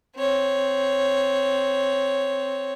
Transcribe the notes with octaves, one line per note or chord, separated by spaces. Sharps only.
C4 C#5